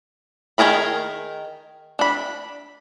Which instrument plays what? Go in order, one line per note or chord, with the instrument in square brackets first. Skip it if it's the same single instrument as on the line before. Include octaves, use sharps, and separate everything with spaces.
[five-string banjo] D#3 D#4 G#4 A#4 B5
D4 B5